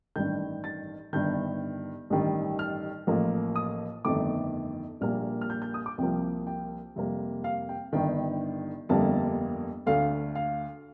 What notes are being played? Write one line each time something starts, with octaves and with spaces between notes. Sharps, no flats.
A1 G2 D#3 G6
A6
G1 G2 D#3 G6
A1 G2 D#3 G3
F6
A1 A2 F3 A#3
D#6
G1 F2 D#3 A3 D6
A#1 A#2 G3 A#3 F6
F6
G6
G6
D#6
D6
C2 C3 F3 A#3 G5
G5
F2 C3 G3 A#3
F5
G5
G1 G2 D#3 G5
G1 F2 D3 G3 A#3 A5
D2 D3 A3 F5
F5